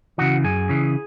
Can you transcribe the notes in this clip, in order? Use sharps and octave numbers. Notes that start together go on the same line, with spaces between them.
C#3 E3 F#4
F#2 G#4
C#3 E3